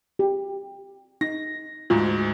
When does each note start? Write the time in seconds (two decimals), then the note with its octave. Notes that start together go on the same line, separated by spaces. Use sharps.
0.19 G4
1.21 D#4 A#6
1.90 D2 G#2 F4